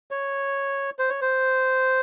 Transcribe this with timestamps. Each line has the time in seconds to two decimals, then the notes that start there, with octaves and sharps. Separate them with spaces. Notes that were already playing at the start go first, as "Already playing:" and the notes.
0.11 C#5
0.99 C5
1.09 C#5
1.21 C5